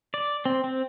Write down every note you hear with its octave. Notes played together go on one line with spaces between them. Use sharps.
D5
C4
C4